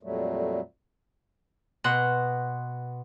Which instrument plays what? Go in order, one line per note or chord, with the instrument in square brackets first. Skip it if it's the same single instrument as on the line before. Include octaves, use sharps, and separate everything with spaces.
[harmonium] F2 A#2 F#3 G3 A3
[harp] B2 F#5 C6